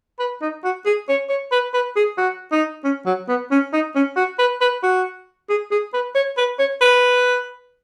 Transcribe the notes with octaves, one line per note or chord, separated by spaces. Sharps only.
B4
D#4
F#4
G#4
C#5
C#5
B4
B4
G#4
F#4
D#4
C#4
F#3
B3
C#4
D#4
C#4
F#4
B4
B4
F#4
G#4
G#4
B4
C#5
B4
C#5
B4